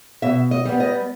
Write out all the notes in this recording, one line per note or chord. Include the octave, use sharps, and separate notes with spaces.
B2 E5
D#5
G3 B3
D#5